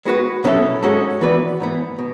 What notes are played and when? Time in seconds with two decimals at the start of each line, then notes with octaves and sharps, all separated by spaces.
0.05 G#3 B3 F#4 B4
0.44 B2 F#3 C#4 E4 A4
0.83 G#2 G#3 C#4 F#4 A4
1.21 E3 B3 F#4 B4 D5
1.60 G#2 E3 B3
1.99 B2